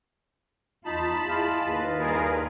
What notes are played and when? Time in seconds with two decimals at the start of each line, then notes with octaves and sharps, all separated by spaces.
0.85 E2 D#4 F4 A5 B5
1.28 E4 F4 G#4 D#5 F5
1.66 D#2 B4
2.00 G2 G#4 A#4